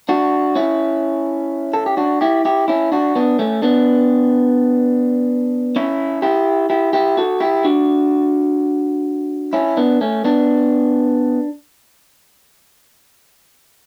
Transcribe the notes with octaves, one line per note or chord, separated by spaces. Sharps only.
D4 F#4
C#4 E4
A4
G4
D4 F#4
E4 G4
E4 G4
C#4 E4
D4 F#4
B3 D4
A3 C#4
B3 D4
C#4 E4
E4 G4
E4 G4
E4 G4
F#4 A4
E4 G4
D4 F#4
C#4 E4
B3 D4
A3 C#4
B3 D4